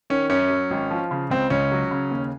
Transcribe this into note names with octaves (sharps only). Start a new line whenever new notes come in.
D#3 C#4
F#2 C#4
F#3
G#1
F3
C#3
C#2 C4
C#2 C#4
F#3
C#3
D#2